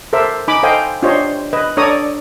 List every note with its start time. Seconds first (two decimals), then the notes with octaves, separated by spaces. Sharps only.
0.13 A4 A#4 C5 E5 D6
0.48 D#4 G#5 B5 D6
0.63 A4 C5 D#5 F5 G5 G#5
1.02 D4 F4 G4 C5 C#5 D#5
1.53 B4 D#5
1.77 D4 A4 C#5 D5 A#5 D#6